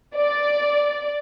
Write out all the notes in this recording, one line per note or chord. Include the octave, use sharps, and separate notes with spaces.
D5